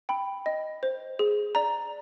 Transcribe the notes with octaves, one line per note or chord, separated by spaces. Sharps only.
G5 B5
D#5
C5
G#4
D5 A#5